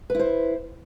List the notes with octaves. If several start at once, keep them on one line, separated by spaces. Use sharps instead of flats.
E4 B4 C5